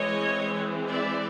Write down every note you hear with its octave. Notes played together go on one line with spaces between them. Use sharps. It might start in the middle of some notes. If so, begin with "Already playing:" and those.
Already playing: E3 G#3 C4 C#5 D#5
D5 E5